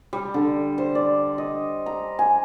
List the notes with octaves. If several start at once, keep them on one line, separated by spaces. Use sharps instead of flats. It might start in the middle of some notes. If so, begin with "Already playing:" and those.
G3
D3
C5
D5
D#5
A#5
G#5